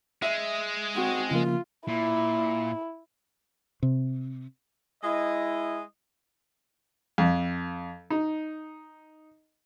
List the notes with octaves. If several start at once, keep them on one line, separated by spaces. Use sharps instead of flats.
G#3 E5
C4 F#4
C#3 F3 A#3 F4
A#2 E4
C3
G#3 E4 D#5
F2
D#4